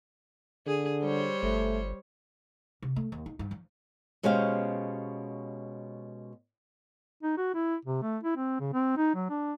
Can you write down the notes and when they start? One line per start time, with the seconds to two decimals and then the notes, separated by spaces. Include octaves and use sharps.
0.67 D3 G#4
1.01 G3 C5 C#5
1.43 G1 A3
2.82 C3
2.96 A3
3.12 D#2
3.26 D#4
3.39 G2
3.51 F3
4.23 B2 G#3 C#4 G4 C5 F5
7.23 D#4
7.37 F#4
7.54 E4
7.85 C3
8.02 A3
8.24 E4
8.37 C4
8.60 C#3
8.73 C4
8.97 D#4
9.15 F#3
9.30 D4